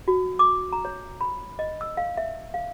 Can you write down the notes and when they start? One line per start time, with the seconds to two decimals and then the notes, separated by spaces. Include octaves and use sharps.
0.08 F#4
0.39 D6
0.73 A#5
0.85 C#5
1.21 B5
1.59 D#5
1.81 E6
1.97 F5
2.17 E5
2.54 F5